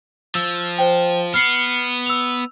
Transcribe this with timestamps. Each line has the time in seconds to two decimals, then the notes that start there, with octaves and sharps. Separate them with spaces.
0.35 F3 E6
0.78 C5 G5
1.34 B3 F6 C7 C#7
2.06 E6 F7